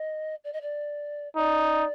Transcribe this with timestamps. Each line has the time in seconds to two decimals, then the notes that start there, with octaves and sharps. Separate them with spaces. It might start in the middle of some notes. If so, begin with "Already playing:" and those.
Already playing: D#5
0.44 D5
0.53 D#5
0.61 D5
1.36 D#4 D5